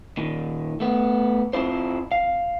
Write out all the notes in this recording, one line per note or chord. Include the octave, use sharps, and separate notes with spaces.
A#2 D#3
A3 B3
C4 E4 F4 C5
F5